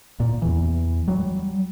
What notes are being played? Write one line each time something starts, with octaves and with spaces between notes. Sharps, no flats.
A#2
E2 E3
F#3 G3